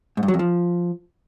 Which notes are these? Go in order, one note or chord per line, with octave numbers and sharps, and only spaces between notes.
G#2
G2
F#3
F2
F3